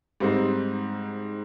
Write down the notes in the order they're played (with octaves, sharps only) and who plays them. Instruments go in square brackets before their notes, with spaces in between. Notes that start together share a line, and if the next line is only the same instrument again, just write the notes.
[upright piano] G#2 G3 C4 D#4